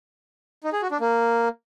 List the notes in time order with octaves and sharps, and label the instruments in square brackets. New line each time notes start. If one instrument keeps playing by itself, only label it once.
[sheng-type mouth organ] D#4
G#4
F#4
D4
A#3